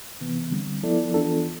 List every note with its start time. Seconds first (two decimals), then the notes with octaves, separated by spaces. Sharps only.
0.21 C3 E3 B3
0.52 D3 G3 C4
0.83 F3 B3 E4 A4 D5
1.14 E3 B3 D4 F4 A4